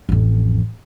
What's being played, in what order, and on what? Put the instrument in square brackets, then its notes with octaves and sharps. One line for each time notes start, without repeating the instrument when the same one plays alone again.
[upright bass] A1 F2